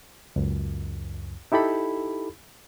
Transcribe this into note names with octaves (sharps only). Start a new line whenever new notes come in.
C#2 F#2
D#4 E4 G4 A4 B5